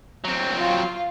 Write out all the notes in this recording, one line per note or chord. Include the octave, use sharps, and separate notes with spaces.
F#3 C4
F4